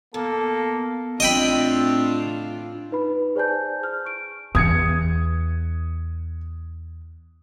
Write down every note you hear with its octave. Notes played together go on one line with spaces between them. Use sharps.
B2 A#3 A4
A2 C4 D4 F4 D#5 G5 B5
D#4 B4 B5
G#4 C5 D5 G#5 A5 G6
F6
C#6 D7
E2 D#6 G#6 C#7